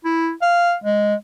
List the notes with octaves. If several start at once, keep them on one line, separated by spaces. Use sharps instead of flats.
E4
F5
G#3